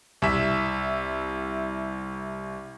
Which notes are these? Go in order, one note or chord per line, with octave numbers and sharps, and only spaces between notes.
C2 E5